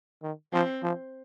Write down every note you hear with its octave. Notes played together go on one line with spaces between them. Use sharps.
D#3
F3 C4
F3